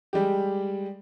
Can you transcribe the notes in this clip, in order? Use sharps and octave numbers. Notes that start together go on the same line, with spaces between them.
G3 G#3 G4